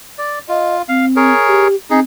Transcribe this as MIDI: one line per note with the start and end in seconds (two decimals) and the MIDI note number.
0.18 0.39 74
0.49 0.82 65
0.49 0.76 75
0.89 1.33 60
0.89 1.06 77
1.16 1.68 68
1.16 1.68 70
1.16 1.68 73
1.48 1.75 67
1.90 2.01 60
1.90 2.00 63
1.90 2.00 68